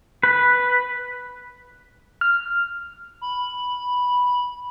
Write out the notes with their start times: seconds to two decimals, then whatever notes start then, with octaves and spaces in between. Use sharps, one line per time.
0.23 B4
2.21 F6
3.21 B5